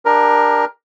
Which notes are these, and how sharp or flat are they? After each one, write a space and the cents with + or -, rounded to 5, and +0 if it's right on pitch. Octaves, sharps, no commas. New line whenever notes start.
D4 +15 G4 +35 A#4 +10